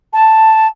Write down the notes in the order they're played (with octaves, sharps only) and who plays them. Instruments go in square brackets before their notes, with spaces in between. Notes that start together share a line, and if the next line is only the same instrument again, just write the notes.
[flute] A5